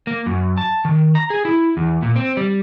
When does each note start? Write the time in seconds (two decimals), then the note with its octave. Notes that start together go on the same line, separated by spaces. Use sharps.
0.07 A#3
0.26 F#2
0.58 A5
0.85 D#3
1.15 A#5
1.30 G#4
1.45 E4
1.77 E2
2.02 A#2
2.16 C4
2.37 G3